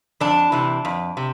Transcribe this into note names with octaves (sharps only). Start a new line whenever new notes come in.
F2 D4
C3 E3
F2
C3